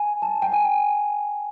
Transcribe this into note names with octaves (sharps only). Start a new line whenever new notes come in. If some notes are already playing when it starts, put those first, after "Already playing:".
Already playing: G#5
A5
G5
G#5